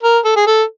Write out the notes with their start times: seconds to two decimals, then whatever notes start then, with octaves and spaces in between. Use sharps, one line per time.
0.03 A#4
0.25 A4
0.36 G#4
0.47 A4